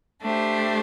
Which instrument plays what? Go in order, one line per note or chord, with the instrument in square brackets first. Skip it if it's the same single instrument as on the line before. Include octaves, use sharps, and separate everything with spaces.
[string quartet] A3 D4 G4 C5